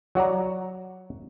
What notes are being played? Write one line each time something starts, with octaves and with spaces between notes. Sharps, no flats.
F#3 F#4 D5 A#5